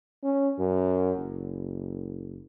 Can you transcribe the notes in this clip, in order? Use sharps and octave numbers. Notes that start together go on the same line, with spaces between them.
C#4
F#2
F#1